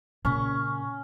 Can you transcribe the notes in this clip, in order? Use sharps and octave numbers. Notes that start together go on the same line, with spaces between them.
A#2 C#3 C#4 C#6